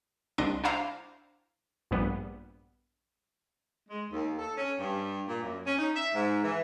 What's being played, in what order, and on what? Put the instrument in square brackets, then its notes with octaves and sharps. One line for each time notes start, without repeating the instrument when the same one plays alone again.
[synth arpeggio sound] C2 D4 D#5 C6 D7
D4 E4 C5 F5 A#5
A#1 G2 G3 B3
[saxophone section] G#3
D#2
A4
C#4
G2
A#2
F#2
C#4
D#4
E5
G#2
E3